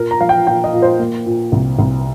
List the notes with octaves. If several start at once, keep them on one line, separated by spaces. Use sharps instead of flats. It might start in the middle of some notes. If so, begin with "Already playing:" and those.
Already playing: A#2 A#4
A#5
F3 F5
G5
A#2 G5
D#5
A#2
C5
A#3
A#2
C2
C2